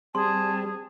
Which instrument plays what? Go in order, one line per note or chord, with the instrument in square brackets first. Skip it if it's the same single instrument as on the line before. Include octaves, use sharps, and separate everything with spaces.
[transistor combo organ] G3 C4 [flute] G#4 [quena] A5 [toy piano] C6